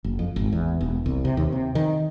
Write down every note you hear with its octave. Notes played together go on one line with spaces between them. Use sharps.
F#1
F2
G#1
E2
E1
C2
C3
D#2
C3
D#3